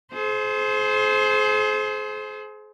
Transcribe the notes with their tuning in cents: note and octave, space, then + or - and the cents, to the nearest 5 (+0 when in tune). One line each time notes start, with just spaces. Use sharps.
G#4 +40 C5 +0